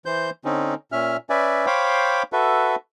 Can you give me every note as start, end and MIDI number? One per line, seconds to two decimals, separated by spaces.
0.06 0.30 52
0.06 0.30 72
0.06 0.30 91
0.45 0.74 50
0.45 0.74 60
0.45 0.74 61
0.45 0.74 63
0.92 1.17 46
0.92 1.17 61
0.92 1.17 76
0.92 1.17 89
1.30 1.66 61
1.30 1.66 71
1.30 1.66 74
1.30 1.66 76
1.30 1.66 80
1.66 2.23 72
1.66 2.23 73
1.66 2.23 77
1.66 2.23 79
1.66 2.23 83
1.66 2.23 86
2.33 2.75 66
2.33 2.75 69
2.33 2.75 71
2.33 2.75 76